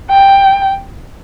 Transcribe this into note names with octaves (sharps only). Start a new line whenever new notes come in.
G5